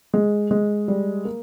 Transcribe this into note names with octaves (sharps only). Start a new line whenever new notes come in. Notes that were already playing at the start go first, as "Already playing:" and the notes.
G#3
G#3
G3
A#3